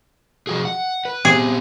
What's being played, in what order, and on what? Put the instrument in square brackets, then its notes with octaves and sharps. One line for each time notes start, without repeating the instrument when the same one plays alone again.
[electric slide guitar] F3 F#4 G#4
F#5
B4
[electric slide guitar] B3 C4 G4 [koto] G#4